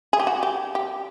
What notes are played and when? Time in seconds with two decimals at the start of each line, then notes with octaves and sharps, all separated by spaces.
0.13 G#4
0.20 G4
0.27 F#4
0.43 G4
0.75 G4